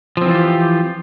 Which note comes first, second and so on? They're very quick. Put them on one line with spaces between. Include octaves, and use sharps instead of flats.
F3 C4 E3 F4 G4